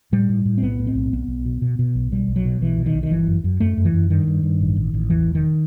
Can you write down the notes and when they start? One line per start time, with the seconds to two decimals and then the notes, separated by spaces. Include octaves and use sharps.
0.12 A2 G3
0.29 A2
0.45 A2
0.58 C4
0.62 B1 B3
0.79 A2
0.87 C4
0.95 B1
1.13 B1 B3
1.28 B1
1.45 B2
1.62 B2
1.79 B2
1.95 B1
2.12 B2 G3
2.28 B1
2.36 F#3
2.45 B2
2.62 B1 E3
2.78 B2
2.86 D#3
2.94 B1
3.03 D#3
3.10 G1 E3
3.27 F#2
3.44 F#2
3.60 F#2 A3
3.77 F#2
3.85 E3
3.93 F#2
4.10 G2 D#3
4.27 G2
4.43 G2
4.61 A1
4.76 A1
4.94 A1
5.10 E2 E3
5.26 E1
5.35 D#3